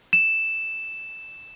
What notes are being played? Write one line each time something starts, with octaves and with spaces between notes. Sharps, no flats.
E7